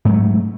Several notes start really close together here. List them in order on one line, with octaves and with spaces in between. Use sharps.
G#2 F#3 A3